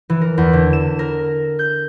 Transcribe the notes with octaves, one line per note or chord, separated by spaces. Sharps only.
E3
A#4
E2
D3
E7
A#4
G6